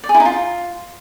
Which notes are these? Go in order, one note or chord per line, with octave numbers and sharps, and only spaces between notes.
D5
G#4
E4
D#4
F4